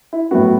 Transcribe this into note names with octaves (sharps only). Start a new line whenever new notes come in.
E4
A2 F#3 B3 F#4